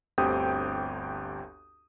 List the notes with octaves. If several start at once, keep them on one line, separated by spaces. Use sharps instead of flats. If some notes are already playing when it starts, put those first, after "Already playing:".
G1 D2 C4 G4 G5 D#6